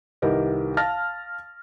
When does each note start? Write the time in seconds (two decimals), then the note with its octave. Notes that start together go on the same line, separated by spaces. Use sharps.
0.22 C2 D#3 G4 A#4 B4 D#5
0.77 F5 A5 F6 A6 A#6